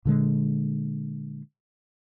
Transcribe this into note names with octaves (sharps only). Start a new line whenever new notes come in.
A#2 D3 G#3